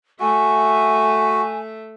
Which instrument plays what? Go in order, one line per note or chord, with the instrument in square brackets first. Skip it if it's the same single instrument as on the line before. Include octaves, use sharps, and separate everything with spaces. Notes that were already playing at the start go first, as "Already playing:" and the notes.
[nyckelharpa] A3 E5 [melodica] F#4 [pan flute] G#5